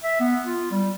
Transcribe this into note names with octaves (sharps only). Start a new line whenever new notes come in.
E5
B3
F4
G3